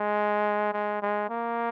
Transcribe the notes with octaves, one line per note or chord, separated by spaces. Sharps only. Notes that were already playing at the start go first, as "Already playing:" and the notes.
Already playing: G#3
G#3
G#3
A#3